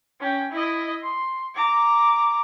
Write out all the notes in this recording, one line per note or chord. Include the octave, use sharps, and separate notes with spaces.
C#4 G5
E4 D#5
C6
A#5 D6